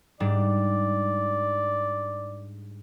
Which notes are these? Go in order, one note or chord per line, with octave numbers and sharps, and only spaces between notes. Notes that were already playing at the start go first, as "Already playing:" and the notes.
G#2 G3 D4 D5